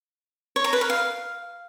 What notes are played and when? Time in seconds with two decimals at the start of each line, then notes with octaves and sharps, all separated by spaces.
0.56 C#5
0.64 A#5
0.73 B4
0.81 A#4
0.90 F5